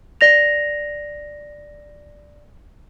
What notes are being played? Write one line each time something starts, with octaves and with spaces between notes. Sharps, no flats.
D5 A#6 F7